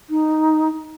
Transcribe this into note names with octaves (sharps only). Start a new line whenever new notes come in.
D#4